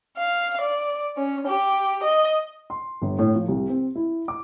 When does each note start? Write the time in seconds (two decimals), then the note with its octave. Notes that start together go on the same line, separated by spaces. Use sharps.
0.17 F5
0.61 D5
1.16 C#4
1.47 G4
2.01 D#5
2.70 C6
3.02 G1
3.19 A2
3.35 F3
3.48 C2
3.69 C4
3.95 E4
4.28 D6